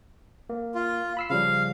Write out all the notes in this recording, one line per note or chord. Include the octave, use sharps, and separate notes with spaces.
A#3
F4
B5 E6 C7
C#3 F3 G3 F5